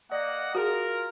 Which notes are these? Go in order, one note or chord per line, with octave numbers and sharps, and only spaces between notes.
A#3 D5 D#5 F#5
F4 F#4 G#4 A#4